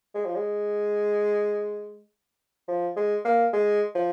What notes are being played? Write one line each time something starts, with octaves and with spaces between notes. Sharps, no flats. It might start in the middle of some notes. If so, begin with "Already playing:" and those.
G#3
F3
G#3
F3
G#3
A#3
G#3
F3